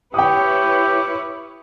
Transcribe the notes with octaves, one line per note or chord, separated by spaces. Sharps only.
E4 G4 B4 C#5 G5 D#6